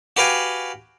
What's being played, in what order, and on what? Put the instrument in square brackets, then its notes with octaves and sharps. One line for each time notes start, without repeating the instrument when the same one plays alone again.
[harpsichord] F#4 G4 B4 F5 G5 G#5